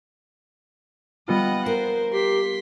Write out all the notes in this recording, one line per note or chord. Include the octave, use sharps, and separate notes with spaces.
G3 B3 F4 D#5 F#5
A#4 C5
G4 C6 B6